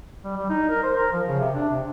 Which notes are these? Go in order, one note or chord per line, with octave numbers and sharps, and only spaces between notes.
G3
G3
D#4
A#4
C5
A#4
F3
C#3
C3
D4
C3